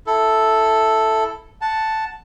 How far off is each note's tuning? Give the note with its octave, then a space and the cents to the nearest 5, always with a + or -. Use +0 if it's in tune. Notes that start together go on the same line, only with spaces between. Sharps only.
E4 +0 A4 +0
F#5 +0 A5 +0